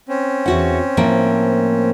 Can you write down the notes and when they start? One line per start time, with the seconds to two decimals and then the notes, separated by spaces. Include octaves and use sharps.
0.09 C4 C#4
0.46 E2 F#4 F#5
0.97 A2 F3 A#3